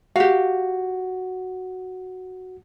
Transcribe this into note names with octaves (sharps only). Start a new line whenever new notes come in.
F#4 G4 F5